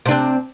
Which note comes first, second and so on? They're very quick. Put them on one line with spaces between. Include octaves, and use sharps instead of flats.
C3 D4 C4